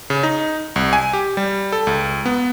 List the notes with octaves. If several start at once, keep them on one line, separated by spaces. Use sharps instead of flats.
C#3
D#4
C2
G#5
G4
G3
A4
C#2
B3